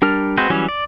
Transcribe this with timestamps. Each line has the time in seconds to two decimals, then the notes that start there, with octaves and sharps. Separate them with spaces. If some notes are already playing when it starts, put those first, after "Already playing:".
0.02 G3 D4 A#4 F6
0.37 G#3 C4 F#4 B4 C5
0.50 E3 F#3 G3 C#4
0.69 D5